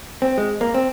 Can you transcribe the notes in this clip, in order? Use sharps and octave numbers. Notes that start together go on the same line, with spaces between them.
C4
G#3
A#3
C4